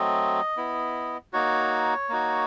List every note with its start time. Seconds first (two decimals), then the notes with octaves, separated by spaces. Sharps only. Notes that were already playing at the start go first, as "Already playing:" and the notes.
Already playing: F#3 A3 C4 D#5
0.57 B3 E4
1.33 A#3 D#4 F#4 C#5
2.09 A#3 D#4 F#4